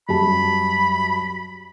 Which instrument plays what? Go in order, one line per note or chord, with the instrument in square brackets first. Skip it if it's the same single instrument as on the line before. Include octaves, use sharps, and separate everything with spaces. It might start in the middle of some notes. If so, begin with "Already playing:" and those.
[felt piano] F#2 G3 A5 [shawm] B5